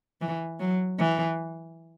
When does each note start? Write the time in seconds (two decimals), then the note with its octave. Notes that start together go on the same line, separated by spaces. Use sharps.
0.21 E3
0.60 F#3
0.99 E3